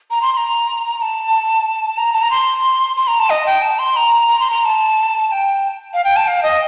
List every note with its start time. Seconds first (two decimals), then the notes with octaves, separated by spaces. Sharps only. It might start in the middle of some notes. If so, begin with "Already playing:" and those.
0.11 A#5
0.22 C6
0.32 C6
0.37 A#5
0.98 A#5
1.02 A5
1.98 A#5
2.13 A5
2.22 A#5
2.31 C6
2.97 C6
3.08 A#5
3.19 A5
3.30 D#5
3.46 G5
3.62 A5
3.79 C6
3.96 A#5
4.28 A#5
4.40 C6
4.51 A#5
4.62 A#5
4.65 A5
5.18 A5
5.28 A5
5.32 G5
5.94 F5
6.04 G5
6.17 A5
6.27 F5
6.43 D#5